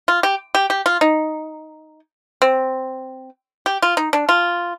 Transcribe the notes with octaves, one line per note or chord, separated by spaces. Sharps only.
F4
G4
G4
G4
F4
D#4
C4
G4
F4
D#4
D4
F4